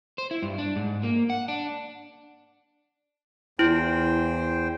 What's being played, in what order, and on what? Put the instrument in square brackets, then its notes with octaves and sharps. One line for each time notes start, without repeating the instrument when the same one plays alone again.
[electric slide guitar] C5
E4
G2
D4
G#2
A#3
F#5
D4
[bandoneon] E2 C5 G5 [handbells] E4